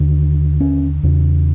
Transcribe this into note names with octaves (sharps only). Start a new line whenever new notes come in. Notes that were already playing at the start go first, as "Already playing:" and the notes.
Already playing: D#2 D3
C#4
E2 C#3